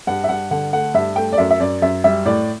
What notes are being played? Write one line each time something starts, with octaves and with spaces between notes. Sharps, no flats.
G2 F#5
E5
G2 F#5
D3 F#5
A3 F#5
G2 E5
A3 G5
D5
F#2 E5
E5
F#2 D5
F#2 E5
G3 E5
A2 D5